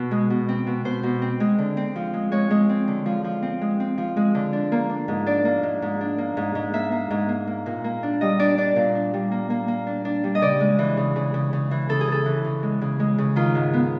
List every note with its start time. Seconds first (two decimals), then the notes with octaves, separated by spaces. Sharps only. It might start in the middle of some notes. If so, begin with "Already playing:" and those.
Already playing: B2
0.11 G#3
0.30 B2
0.49 C4
0.67 B2
0.85 B2 C5
1.03 B2
1.22 C4
1.40 G#3
1.58 D3
1.77 C4
1.96 F3
2.14 G#3
2.32 G#3 C#5
2.51 G#3
2.69 C4
2.88 D3
3.06 F3
3.24 F3
3.43 C4
3.61 G#3
3.80 C4
3.98 F3
4.17 G#3
4.35 D3
4.53 D4
4.72 A#3
4.89 D4
5.08 G#2
5.26 D4 D5
5.45 A#3
5.63 G#2
5.82 G#2
6.01 D4
6.18 A#3
6.37 G#2
6.55 G#2
6.73 A#3 E5
6.92 A#3
7.10 G#2
7.29 A#3
7.47 A#3
7.66 A#2
7.84 A#3
8.03 D4
8.21 G3 D#5
8.39 D4 D5
8.57 D4 D5
8.76 A#2
8.95 D4
9.14 G3
9.31 A#3
9.50 A#3
9.68 A#3
9.87 D4
10.05 D4
10.24 G3
10.35 D#5
10.42 C#3 D5
10.60 G#3
10.79 E3
10.97 C#3
11.16 C#3
11.34 C#3
11.53 C#3
11.71 E3
11.89 C#3 A4
12.01 G#4
12.08 C#3 A4
12.26 E3
12.44 C#3
12.63 G#3
12.81 C#3
13.00 G#3
13.18 C#3
13.36 D#3 F4
13.55 G#2
13.73 B3